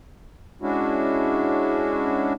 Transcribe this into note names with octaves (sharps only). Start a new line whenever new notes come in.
G#3 C#4 D4 E4 F#4